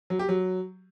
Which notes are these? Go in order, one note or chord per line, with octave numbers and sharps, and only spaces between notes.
F#3
G4
F#3